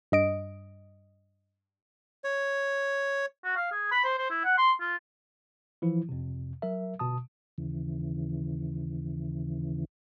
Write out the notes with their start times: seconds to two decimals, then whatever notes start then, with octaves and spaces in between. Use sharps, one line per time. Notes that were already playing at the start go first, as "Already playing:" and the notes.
0.12 G2 D#5 D7
2.24 C#5
3.44 F#4
3.56 F5
3.72 G#4
3.91 B5
4.04 C5
4.18 C5
4.30 E4
4.45 F#5
4.58 C6
4.81 F4
5.82 E3 F3 E4
6.09 F2 C3
6.62 F#3 A#4 E5
6.99 G1 B2 A5 D#6
7.58 D#2 C#3 E3